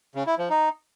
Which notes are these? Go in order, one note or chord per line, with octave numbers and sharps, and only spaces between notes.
C#3
E4
F3
D#4